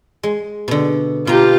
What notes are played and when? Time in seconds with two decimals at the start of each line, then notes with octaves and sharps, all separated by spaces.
0.23 G#3
0.68 B2 D3
1.27 B2 F4 G4 A#5